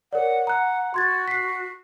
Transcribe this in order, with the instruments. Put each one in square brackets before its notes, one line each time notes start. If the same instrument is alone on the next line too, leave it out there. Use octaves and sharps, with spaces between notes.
[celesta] A#4 C#5 D5 [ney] F#5
[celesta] A#5 F#6
[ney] F#4 [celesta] C6 G#6 A6
[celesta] B6 C7